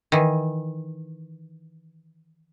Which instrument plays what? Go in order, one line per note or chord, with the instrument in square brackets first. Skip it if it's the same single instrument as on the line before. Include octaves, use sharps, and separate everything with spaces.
[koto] D#3 E3